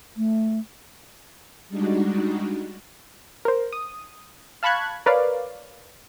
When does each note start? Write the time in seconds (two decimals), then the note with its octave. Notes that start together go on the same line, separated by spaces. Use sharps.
0.17 A3
1.68 G3 G#3 D4 D#4 F#4
3.45 A#4 C5
3.73 D#6
4.63 F5 A5 B5 C#6 F#6 G#6
5.06 A#4 B4 C#5 D5 F5